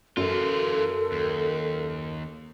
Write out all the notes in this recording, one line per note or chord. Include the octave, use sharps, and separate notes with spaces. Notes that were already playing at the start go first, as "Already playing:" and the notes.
F#2 E3 F4 A4 A#4
D#2